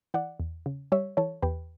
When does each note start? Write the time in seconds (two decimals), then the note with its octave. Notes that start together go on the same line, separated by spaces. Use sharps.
0.14 E3 D5 F#5
0.40 E2
0.66 C#3
0.92 G3 C#5 E5
1.17 E3 A4 C#5
1.42 E2 G4 B4